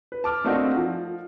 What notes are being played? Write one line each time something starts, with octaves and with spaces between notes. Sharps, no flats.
B4
A5 D6 F6
A3 A#3 C4 D4 D#4 F#4
F3